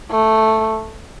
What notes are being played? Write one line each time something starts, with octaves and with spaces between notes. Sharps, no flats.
A3